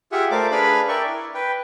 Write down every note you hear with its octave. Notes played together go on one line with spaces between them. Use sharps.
F4 G4 G#4 E5 F#5
A3 A#4 C5 D5 F5 D6
D4 G#4 B4 F5 B5
A#4 D5 E5 G5 C#6
E4
B4 G5